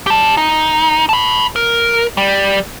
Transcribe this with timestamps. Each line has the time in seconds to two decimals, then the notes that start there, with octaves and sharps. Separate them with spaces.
0.07 G4 A5
0.37 D#4
1.09 A5 B5
1.56 A#4
2.17 G3